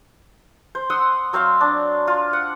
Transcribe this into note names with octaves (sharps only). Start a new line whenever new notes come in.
C5
F#5 C6 D#6 E6
F#3 C4 C5 F5
D4
F4
F#5